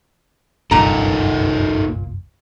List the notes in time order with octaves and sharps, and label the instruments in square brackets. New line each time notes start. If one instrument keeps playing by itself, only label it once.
[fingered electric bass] F#1 C2 G2 [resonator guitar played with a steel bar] A#2 A#5 [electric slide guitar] A#3 D#4 A4